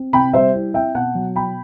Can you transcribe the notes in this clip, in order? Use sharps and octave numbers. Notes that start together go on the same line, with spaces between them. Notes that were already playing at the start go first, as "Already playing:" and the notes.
Already playing: C4
C3 G5 B5
G3 C5 E5
E4
C4 E5 G5
B2 F#5 A5
F#3
B2 G5 B5